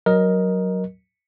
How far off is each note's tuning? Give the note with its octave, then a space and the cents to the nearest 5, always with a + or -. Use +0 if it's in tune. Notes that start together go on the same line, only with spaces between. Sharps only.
F#3 +5 A#4 +15 D#5 +0